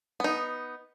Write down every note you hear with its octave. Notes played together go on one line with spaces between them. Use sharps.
B3 D#4